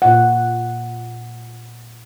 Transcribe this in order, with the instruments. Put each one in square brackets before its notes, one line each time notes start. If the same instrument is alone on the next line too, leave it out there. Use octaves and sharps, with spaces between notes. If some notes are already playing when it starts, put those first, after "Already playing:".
[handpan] A#2 F#5